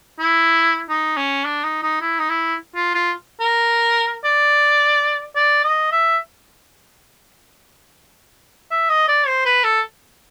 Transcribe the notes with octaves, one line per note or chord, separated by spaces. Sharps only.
E4
D#4
C#4
D4
D#4
D#4
E4
D#4
E4
F4
F4
A#4
D5
D5
D#5
E5
E5
D#5
D5
C5
B4
A4